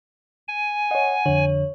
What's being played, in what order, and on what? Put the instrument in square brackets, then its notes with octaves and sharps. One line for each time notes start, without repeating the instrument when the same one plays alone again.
[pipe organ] G#5
[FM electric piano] C#5 D#5 [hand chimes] F#5
[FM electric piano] F2 D3 [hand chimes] C#5